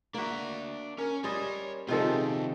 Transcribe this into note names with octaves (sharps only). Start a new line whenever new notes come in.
A#3 D4 F#4 E5
C#4 A#4
G3 C#4 C#5 D#5 C6
C3 D#3 F3 G#3 C4 D#4 F4 A4